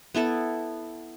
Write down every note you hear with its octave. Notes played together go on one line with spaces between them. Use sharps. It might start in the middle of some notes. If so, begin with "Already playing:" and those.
B3 E4 A4 A5